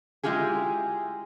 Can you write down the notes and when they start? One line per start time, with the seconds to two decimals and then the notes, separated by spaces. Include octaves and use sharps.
0.23 G#3 E4 F4 G4 G#4